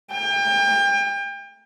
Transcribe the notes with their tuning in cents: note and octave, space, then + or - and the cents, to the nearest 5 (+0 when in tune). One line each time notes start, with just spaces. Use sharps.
G5 +35